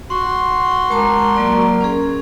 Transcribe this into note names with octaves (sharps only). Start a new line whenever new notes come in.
F#4 F#5 C6
G#3 A#4 A5 D6
F#3 A#3 D5
C#4 G#4